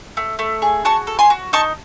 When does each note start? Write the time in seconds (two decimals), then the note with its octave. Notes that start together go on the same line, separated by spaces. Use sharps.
0.17 A3
0.39 A3
0.62 G#4
0.85 F#4 A5 C#6
1.07 A4
1.19 G#5 C6
1.30 F#4
1.53 D#4 A5 C#6